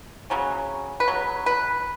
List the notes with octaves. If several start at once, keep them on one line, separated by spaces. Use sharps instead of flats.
C#3 F#3 C#4
B4
C#3 F#3
B4